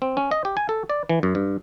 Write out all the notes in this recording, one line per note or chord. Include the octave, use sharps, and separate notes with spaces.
C4
C#4
D#5
G4
G#5
A4
D5
E3
F#2
G2